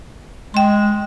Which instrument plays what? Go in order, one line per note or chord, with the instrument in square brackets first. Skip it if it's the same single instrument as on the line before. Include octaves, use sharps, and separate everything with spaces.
[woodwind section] G#3 [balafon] G5 C6